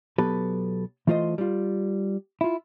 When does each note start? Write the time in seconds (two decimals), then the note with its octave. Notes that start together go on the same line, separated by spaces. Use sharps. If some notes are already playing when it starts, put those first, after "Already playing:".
0.18 B1 F#3 B3 G4 A4 B4
1.07 E3 A3 F4 C5 D#5
1.38 G3 F4
2.41 E4 F4